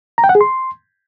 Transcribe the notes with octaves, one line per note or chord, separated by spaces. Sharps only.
A#5
G5
F#5
G#4
C6